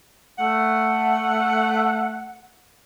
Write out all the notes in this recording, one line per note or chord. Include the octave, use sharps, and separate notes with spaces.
A3 F#5